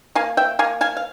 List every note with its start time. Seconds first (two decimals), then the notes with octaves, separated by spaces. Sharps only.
0.15 A#3 F5 G#5
0.37 E5 G5
0.59 A#3 F5 G#5
0.81 F5 G#5
0.97 F5